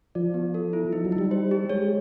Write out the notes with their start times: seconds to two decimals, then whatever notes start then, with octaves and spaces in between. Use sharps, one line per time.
0.15 F3 D5
0.34 B3
0.54 A4
0.73 E4
0.92 F3 D#4
1.05 F#3
1.12 D#4
1.18 G3
1.31 C5
1.51 G4
1.69 G#3 C#5